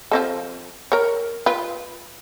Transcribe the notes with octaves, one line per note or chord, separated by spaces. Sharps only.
F3 C4 A4
A#4 C#5
F4 B4